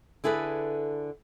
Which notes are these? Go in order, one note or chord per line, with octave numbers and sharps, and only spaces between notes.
D3 E4 G#4 A4 B4